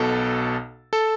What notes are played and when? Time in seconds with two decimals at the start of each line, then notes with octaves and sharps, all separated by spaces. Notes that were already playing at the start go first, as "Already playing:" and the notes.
Already playing: B1 B2 A4
0.93 A4